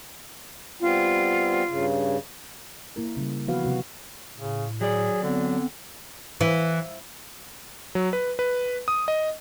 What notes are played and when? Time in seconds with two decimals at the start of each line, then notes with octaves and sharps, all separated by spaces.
0.81 G3 B3 C4 F4
1.68 G2 C#3
2.96 A#3 E4 A#4
3.17 C#3 G3
3.47 E3 F3 B3 F#4 B4 F5
3.64 C3 F#3 F#4
4.38 A2 C#3
4.81 F#3 G#4 D5
5.23 D3 B3 C4
6.41 E3
7.95 F#3
8.13 B4
8.39 B4
8.88 D#6
9.08 D#5